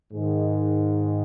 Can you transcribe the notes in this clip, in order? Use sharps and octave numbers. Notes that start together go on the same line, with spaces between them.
G#2 D#3 G#3